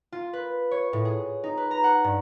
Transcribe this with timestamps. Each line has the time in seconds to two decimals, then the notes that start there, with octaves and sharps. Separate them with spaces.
0.12 F4
0.33 B4
0.71 C#5
0.93 A2
1.05 G#4
1.44 D#4
1.57 B4
1.71 A#5
1.84 F#5
2.04 G2